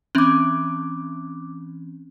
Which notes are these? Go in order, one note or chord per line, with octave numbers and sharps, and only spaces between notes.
E3 C4 C#4 D6 F#6